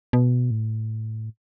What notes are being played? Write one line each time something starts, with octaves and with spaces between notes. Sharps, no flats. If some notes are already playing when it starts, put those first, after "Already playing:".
B2
A2